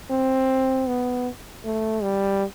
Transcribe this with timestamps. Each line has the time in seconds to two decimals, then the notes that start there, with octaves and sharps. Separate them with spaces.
0.10 C4
0.88 B3
1.64 A3
2.03 G3